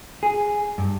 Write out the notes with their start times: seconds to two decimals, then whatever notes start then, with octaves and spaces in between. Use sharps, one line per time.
0.23 G#4
0.78 G2